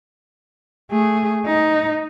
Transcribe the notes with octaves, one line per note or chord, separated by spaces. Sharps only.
A3 G#4
D#4